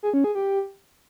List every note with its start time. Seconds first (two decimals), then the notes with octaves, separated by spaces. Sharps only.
0.03 G#4
0.14 C#4
0.24 G#4
0.35 G4